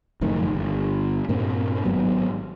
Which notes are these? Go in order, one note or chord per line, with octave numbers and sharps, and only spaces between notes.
F#1 F2 A2 D#3
G1
G2 A#2 A#3 C4
G#1 G#2 F#3 B3